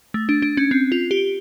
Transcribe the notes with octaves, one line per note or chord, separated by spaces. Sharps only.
A3
D4
D4
C#4
C4
F4
G4